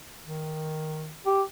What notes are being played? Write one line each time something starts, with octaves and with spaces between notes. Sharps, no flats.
D#3
G4